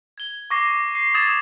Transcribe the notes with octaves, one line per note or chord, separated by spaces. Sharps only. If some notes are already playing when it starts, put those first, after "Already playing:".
G#6 G7
C#6 D6 A#6 C7 G7
A#6
C7
D#6 G#6 A6 E7 F7